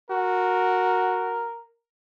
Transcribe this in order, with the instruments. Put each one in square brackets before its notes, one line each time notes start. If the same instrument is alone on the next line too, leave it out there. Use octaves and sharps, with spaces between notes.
[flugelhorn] F#4 [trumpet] A#4